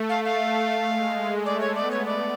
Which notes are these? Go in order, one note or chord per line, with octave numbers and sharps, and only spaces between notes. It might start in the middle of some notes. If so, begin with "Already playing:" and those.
Already playing: A3
F5
F5
G#3
A3 D5
C#5
B3 D5
C#5
D5